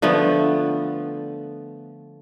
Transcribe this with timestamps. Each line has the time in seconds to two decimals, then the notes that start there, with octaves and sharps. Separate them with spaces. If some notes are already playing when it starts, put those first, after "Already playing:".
0.02 D3 F3 A3 B3